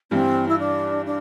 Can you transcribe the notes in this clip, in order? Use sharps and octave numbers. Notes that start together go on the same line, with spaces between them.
G2 E3 G3 C4
E4
D4
D4